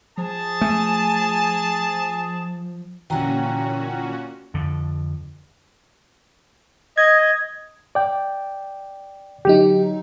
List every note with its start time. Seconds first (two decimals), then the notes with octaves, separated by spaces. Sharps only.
0.17 F3 G#4 A5
0.61 A3 G#5
3.10 A#2 D3 E3 C#4 F#4 G5 A#5
4.54 F2 D3
6.98 D#5 G#6
7.95 D5 G5
9.45 D3 F#3 D#4 G4